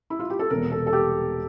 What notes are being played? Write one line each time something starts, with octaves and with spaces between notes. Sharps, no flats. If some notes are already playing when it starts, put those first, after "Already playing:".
E4
F4
G4
A4
E1 E2 C3 A#4
A4
A4
G4